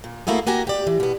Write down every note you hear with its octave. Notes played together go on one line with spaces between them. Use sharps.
A#2
A3 A#3 E4 F#4 G#4
A#3 F#4 G4 G#5 A#5
G4 D5
E3
B2 B3